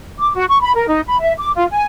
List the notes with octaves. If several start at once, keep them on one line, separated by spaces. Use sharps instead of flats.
D6
F#4
C#6
B5
A#4
D#4
B5
E5
D6
F4
G#5